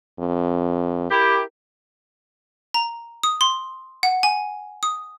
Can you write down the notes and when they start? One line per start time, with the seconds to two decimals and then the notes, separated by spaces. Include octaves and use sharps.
0.20 F2
1.11 E4 G4 A#4
2.74 A#5
3.23 D#6
3.41 C6
4.03 F#5
4.23 G#5
4.83 D#6